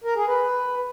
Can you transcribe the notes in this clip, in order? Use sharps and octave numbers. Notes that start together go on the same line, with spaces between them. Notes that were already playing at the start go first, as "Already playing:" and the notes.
A#4
G#4
B4